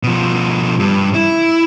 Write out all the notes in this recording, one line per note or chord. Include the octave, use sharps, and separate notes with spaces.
B2 F3
G2
E4